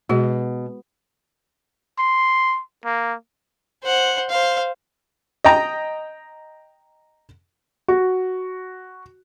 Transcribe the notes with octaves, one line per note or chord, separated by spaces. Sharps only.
B2 G#3 F#4 G#4
C6
A#3
C5 F#5
C5 F5
D#5 G5 A#5
F#4